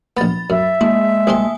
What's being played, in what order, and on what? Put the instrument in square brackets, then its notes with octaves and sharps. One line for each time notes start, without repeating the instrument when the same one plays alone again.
[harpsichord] A#1 B3 [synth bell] B5 A6
[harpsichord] F#2 [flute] E5
[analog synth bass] G#3 [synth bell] A#3 [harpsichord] E4
[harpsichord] C2 C4 C6 [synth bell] A#3 G#5 D#6